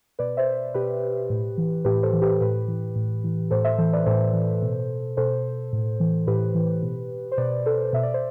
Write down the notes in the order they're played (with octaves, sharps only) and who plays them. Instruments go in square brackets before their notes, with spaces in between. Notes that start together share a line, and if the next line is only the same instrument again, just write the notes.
[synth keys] B2 B4 D5
C5 E5
B2 G4 B4
A2
E3
A2 G4 B4
A4 C5
E3
G4 B4
A2 G4 B4
E3
A2
E3
A2 A4 C5
C5 E5
E3 A4 C5
B4 D5
A2 A4 C5
E3
B2
B2 A4 C5
A2
E3
A2 G4 B4
E3
B2
C5
B2 B4 D5
A4 C5
B2 E5
D5
C5